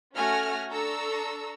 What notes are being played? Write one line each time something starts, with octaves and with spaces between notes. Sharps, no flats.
A3 C#4 F#4 G#5 F6 A#6
D4 A4 A#5 C#6 E6